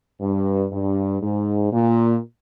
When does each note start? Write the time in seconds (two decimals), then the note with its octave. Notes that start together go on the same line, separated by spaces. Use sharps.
0.20 G2
0.72 G2
1.22 G#2
1.71 A#2